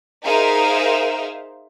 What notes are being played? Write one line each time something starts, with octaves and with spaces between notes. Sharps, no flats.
D#4 G#4 A#4 C5 E5 F5